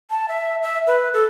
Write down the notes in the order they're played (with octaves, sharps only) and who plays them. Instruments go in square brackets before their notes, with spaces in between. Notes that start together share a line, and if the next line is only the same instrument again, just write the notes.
[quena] A5
E5
E5
B4
A4